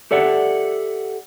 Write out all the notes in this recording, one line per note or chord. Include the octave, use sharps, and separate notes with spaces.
G4 A4 D5 E5 F#5